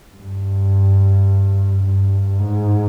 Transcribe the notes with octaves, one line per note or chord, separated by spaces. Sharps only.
G2
G2
G#2